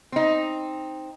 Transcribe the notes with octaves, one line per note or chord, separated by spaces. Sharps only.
C4 D#4